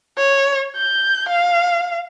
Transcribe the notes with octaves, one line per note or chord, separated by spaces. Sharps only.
C#5
G6
F5